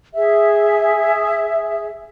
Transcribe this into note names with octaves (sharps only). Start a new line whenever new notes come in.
G#4 E5